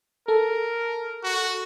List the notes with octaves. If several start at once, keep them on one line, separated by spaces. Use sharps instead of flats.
A4 A#4 A5
F#4